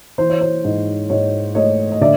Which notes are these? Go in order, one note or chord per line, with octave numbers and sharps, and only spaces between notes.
E3 C5
C#5
C5
G#2
G#2 C#5
A3 C#5 D#5
D#5
D3 D5 E5